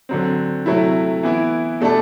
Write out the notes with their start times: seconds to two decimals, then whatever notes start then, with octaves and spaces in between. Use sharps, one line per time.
0.09 D3 F#3 C4
0.66 C3 F#3 A3 E4
1.23 E3 B3 E4
1.80 B2 A3 D4 A4